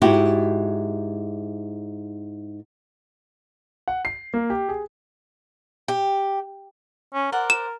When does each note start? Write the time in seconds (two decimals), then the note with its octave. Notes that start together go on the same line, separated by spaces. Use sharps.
0.02 G#2 E4 F#4 G4
3.88 F#5
4.05 C7
4.34 A#3
4.50 G4
4.69 G#4
5.88 G4
7.14 C#4
7.32 A#4 C5 D5 F#5
7.50 E7